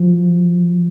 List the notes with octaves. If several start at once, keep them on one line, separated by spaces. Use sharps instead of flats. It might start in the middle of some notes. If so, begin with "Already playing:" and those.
Already playing: F3